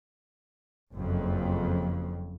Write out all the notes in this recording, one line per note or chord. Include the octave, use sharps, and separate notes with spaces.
F#1 F2